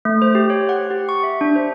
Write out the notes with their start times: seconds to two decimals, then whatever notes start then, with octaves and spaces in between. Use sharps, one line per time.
0.05 A3
0.22 C5
0.35 G4
0.50 C#5
0.69 F#5
0.90 G4
1.09 C#6
1.23 E5
1.41 D4
1.56 C5